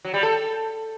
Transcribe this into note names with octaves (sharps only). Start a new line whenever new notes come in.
F#3
G3
A4